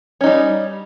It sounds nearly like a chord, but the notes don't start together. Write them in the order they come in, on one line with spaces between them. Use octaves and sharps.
C#4 D#4 G3